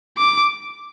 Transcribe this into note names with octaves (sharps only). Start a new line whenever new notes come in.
D6